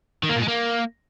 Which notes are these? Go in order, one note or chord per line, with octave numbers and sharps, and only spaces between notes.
D#3
A#3
A#2
G#3
A#3